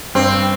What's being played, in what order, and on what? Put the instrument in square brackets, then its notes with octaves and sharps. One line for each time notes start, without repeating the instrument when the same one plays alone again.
[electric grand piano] G2 [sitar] C4